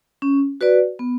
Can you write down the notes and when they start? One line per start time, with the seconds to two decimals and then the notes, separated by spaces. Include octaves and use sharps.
0.22 C#4
0.61 F#4 B4 D5
0.99 B3